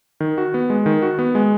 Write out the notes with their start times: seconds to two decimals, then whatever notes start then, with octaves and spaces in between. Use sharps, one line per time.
0.20 D#3
0.38 F#4
0.54 B3
0.70 G#3
0.86 D#3
1.02 F#4
1.19 B3
1.35 G#3